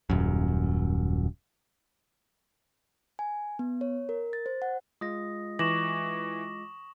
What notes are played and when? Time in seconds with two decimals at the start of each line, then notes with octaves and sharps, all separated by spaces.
0.10 D#1 F#2
3.19 G#5
3.59 B3
3.81 C#5
4.09 A#4
4.33 A6
4.46 C5
4.62 F#5
5.01 G#3 F4 D#5 D#6 A#6
5.59 E3 C#6 D6 A#6 E7 F#7